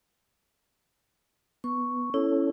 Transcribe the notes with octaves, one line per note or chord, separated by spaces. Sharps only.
B3 C#6
C#4 E4 A4 C#5